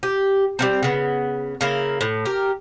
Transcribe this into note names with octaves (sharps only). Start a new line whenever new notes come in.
G4
G3 A#3 C4
C#3 B3
C#3 A#3 E4
A2
G4 A#4